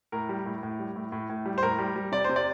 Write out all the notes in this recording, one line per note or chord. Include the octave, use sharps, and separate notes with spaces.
A2 A#4
G3
A2
A2
G3
A2
A2
A2
G3
C5
A2 A#4
G3
G3
C3 D5
C3 C5
D5